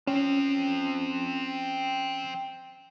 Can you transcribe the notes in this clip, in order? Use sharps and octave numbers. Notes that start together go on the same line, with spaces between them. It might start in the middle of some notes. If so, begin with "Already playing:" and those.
F3 C4 C#4